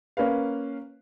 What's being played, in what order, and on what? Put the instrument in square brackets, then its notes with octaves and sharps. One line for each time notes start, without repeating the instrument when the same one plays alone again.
[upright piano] A#3 C#4 A#4 B4 F5